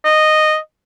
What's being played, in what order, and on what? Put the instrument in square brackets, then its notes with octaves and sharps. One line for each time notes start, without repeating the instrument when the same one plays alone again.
[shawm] D#5